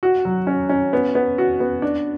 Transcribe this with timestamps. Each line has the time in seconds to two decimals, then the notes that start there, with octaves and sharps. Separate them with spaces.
0.03 F#4
0.25 F#3
0.47 C#4
0.69 C#4
0.93 B3
1.15 B3
1.38 F#4
1.60 B3
1.82 D4